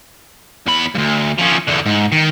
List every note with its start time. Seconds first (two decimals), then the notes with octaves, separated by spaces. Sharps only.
0.66 E2 B5
0.95 D2 G2
1.38 F3 C#4
1.67 E2 D3
1.86 G#2
2.12 D#3